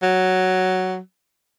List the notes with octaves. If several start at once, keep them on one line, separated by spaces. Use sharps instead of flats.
F#3